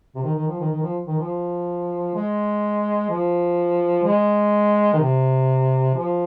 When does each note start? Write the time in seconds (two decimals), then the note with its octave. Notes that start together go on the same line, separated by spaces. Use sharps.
0.15 C3
0.24 D#3
0.35 D#3
0.48 F3
0.60 D#3
0.71 D#3
0.83 F3
1.07 D#3
1.19 F3
2.15 G#3
3.09 F3
4.04 G#3
4.93 D#3
4.99 C3
5.95 F3